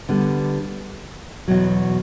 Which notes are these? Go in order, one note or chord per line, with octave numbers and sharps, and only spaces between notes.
D3 G3 B3
E2 B2 F#3